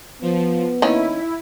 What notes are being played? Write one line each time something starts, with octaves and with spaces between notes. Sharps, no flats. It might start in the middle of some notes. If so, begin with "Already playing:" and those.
F3 B3
D#3 A#3 C#4 E4